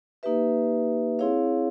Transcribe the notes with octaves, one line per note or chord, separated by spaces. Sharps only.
A#3 D#4 G4 B4 E5
C4 E4 G#4 C#5 F5